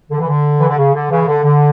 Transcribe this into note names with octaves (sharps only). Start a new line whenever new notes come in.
D3
E3
D3
E3
D3
C#3
D3
C#3 E3
D3
D3